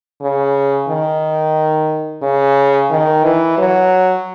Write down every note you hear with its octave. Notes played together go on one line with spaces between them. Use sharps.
C#3
D#3
C#3
D#3
E3
F#3